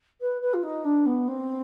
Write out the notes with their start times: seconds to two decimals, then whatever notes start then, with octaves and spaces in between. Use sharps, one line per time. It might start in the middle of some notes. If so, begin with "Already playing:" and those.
0.20 B4
0.41 B4
0.53 F4
0.63 D#4
0.84 D4
1.05 B3
1.27 C4